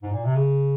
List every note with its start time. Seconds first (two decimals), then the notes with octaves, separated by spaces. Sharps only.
0.03 G#2
0.13 A#2
0.24 C3
0.36 C#3